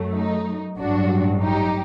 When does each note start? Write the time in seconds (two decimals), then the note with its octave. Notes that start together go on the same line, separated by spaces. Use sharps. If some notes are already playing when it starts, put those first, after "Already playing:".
Already playing: F#2 F#3 A3
0.14 D#4
0.79 A1 G2 F#3 D4 F#4
1.43 D#4 G4